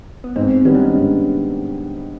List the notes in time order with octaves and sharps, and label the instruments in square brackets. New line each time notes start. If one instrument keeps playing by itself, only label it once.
[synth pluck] B3
[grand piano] G#2 [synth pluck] C4
[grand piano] D#3 G3 B3 D#4 [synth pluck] C#4
[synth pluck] D4
C#4
[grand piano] G#2